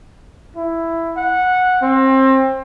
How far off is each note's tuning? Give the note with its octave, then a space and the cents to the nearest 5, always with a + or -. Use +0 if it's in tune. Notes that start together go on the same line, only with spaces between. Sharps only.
E4 +10
F#5 -10
C4 +25